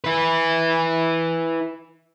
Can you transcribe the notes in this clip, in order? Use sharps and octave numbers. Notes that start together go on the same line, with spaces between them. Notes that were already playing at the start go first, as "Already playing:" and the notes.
E4 B4